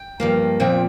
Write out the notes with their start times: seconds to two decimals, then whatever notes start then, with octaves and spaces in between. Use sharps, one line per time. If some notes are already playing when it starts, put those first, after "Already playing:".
Already playing: G5
0.20 G2 F3 A#3
0.60 A#2 F3 C4 G5